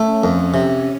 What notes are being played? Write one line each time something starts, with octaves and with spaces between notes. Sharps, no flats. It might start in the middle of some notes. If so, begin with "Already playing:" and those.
Already playing: A3 C#4
F2
C3